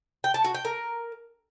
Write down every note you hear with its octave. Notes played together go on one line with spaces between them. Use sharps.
G5
A5
F#4
G5
A#4